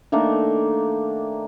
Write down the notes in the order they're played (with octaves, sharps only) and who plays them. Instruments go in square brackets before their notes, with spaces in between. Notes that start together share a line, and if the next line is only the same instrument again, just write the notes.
[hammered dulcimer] D#3 A3 A#3 D4